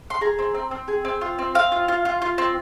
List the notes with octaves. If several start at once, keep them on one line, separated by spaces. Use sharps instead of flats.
C6
G#4 A#5
C4
C4
C4
G#4
C4
F4
C4
C4 F5
F4
F4
F4
F4
C4